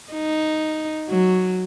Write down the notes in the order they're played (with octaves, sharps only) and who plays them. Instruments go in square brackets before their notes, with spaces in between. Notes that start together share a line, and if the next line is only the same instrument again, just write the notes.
[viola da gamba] D#4
F#3